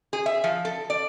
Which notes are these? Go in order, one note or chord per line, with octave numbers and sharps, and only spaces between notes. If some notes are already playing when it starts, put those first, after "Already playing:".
G#4
E5
F3
A4
D5